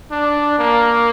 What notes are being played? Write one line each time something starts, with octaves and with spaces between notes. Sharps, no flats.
D4
A#3